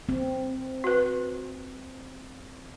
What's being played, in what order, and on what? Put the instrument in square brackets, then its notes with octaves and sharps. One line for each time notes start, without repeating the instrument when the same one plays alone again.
[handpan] C4
[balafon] F#4 B4